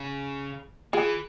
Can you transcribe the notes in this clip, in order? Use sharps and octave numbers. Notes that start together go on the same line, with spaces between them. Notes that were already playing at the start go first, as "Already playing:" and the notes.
Already playing: C#3
E3 F4 G#4